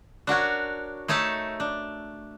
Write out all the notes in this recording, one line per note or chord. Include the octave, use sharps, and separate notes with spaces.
D4 F#4 A#4 C#5
A3 D#4 C#5 E5 A5
D4